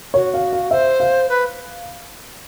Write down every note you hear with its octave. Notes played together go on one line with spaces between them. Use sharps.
F#4 C#5
F5
F5
C5 E5
F5
B4